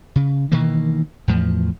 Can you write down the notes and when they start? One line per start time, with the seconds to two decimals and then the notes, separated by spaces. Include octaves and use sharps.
0.16 C#3
0.52 B2 D#3 E3 A#3
1.28 E2 A2 F3